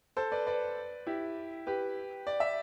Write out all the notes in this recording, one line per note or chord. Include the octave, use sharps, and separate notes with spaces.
A4 C5
B4 D5
B4 D5
E4 G4
G4 B4
D5
E5